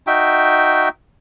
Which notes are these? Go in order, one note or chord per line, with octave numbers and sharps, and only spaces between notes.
D#4 F#4 E5 G5